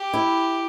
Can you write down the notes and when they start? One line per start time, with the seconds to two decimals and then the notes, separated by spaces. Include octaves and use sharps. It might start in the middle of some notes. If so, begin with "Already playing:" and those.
Already playing: G4
0.14 E4